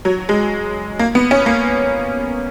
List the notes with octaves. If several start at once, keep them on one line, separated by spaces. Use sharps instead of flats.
F#3
G#3
A#3
B3
C#4
A#3